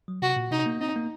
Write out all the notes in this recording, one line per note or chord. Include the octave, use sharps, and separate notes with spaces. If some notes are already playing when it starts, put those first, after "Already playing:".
F#3
C3 F#4
A#2
C3 D#4
A#3
C4 D#4
A#3